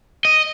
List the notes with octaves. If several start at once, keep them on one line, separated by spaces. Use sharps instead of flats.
D#5